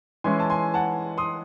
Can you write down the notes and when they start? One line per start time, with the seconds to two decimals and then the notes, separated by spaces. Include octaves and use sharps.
0.24 E3 G#3 C#4 E4 G#5 C6
0.40 A5
0.50 G#5 C6
0.74 F#5 A5
1.18 C6 D#6